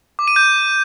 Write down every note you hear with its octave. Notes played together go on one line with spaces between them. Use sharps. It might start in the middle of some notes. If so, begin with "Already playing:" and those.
D6
D#7
G6